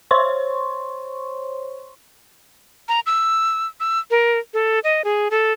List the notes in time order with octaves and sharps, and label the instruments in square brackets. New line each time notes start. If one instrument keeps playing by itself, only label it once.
[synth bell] C5 C#5 C6 C#6
[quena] A#5
E6
E6
A#4
A4
D#5
G#4
A4